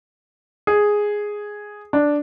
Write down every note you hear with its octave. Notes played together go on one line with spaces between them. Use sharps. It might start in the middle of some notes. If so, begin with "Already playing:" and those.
G#4
D4